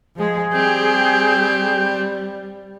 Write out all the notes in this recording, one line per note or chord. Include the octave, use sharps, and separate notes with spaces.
F3 G#3 G#4
G3 C4 G4 G6